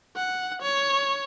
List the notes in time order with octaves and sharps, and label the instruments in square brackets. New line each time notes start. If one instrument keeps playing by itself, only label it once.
[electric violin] F#5
C#5